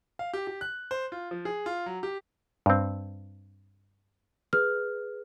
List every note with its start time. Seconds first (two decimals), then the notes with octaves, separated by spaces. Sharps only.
0.19 F5
0.34 G4
0.47 G4
0.61 F#6
0.91 C5
1.12 F4
1.31 F3
1.45 G#4
1.66 F4
1.86 F#3
2.03 G4
2.66 G2 C4
4.53 G#4 B4 F6